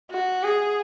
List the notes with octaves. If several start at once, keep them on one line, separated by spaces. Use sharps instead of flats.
F#4
G#4